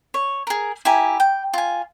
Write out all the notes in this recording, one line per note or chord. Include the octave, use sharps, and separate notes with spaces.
C#5
G#4 A#4
E4 G4 G#5 A#5
G5
F4 G#5